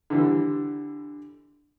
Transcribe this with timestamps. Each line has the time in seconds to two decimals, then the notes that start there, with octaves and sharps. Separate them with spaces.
0.10 D3 E3 G3